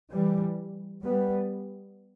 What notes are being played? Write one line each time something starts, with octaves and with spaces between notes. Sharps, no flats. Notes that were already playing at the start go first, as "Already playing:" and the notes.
E3 G3
G3 B3